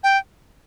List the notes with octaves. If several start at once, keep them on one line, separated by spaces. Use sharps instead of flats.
G5